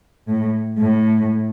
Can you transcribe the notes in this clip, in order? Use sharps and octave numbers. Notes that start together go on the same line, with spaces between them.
A2
A2